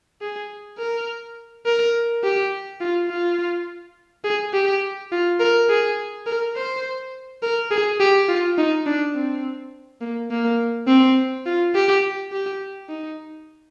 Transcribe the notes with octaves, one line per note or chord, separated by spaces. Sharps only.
G#4
A#4
A#4
G4
F4
F4
G#4
G4
F4
A#4
G#4
A#4
C5
A#4
G#4
G4
F4
D#4
D4
C4
A#3
A#3
C4
F4
G4
G4
D#4